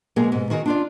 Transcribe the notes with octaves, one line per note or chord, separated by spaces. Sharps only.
B2 F#3 G#3 A#3 G#4 A#4
G#2 B2
D#3 F#4 G#4 A#4
D4 F4 D5